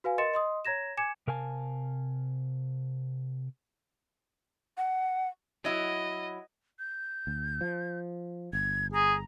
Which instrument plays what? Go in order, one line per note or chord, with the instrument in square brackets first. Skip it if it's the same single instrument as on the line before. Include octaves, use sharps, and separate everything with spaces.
[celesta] F#4 B4 F5 G#5
A#4 D#5 C6 A6 C#7 E7
D#5 C6 D#6
C#5 A#5 G#6 A#6 E7
G#5 D6 G#6 C#7 E7
[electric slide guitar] C3 A#4 F5 G#5 A5
[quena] F#5
[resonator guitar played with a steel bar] F#3 E4 [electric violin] D#5
[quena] G6
[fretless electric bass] D2
F3
[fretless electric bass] G1 [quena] G#6
[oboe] G#4 [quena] A#5